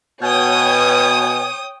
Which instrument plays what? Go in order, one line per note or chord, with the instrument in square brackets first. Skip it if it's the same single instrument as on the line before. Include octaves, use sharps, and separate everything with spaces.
[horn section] B2 G#5 [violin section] C#5 G5 D#6